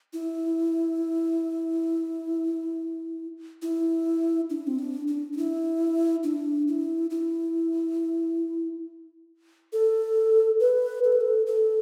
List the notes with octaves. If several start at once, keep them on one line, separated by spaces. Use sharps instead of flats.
E4
E4
D4
C4
D4
D4
D4
E4
D4
E4
E4
A4
B4
A4
B4
A4
A4